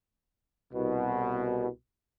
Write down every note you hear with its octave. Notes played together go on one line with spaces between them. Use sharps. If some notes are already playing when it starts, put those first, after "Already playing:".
C2 B2